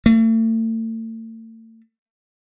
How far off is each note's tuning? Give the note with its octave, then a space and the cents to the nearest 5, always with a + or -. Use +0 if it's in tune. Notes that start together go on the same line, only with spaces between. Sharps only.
A3 +40